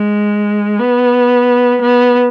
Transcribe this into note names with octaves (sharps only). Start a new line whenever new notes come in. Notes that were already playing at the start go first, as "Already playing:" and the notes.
Already playing: G#3
B3
B3